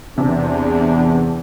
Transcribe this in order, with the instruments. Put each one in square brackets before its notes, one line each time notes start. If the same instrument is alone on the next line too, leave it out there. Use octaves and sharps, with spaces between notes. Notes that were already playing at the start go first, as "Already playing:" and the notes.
[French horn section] E2 [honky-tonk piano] C3 [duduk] D4